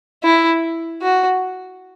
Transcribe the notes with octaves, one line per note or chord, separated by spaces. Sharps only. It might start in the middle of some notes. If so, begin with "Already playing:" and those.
E4
F#4